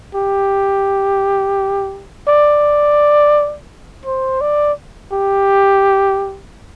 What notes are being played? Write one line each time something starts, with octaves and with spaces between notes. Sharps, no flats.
G4
D5
C5
D5
G4